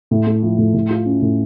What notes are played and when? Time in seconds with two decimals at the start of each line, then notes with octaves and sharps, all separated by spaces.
0.11 A2
0.27 A3
0.43 F3
0.58 A2
0.74 A2
0.90 F4
1.06 C#4
1.22 A2